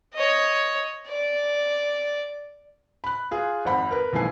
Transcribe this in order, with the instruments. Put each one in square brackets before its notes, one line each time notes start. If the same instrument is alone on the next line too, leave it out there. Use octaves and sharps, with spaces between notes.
[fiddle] C#5 D#5
D5
[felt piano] B5 F#6
F4 G#4
G#1 F2 F#5 B5
A#4 B4
B1 E3 F3 A3 G#5 C7